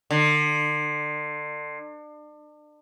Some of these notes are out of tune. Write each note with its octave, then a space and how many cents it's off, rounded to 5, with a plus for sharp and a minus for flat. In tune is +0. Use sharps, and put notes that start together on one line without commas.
D3 +35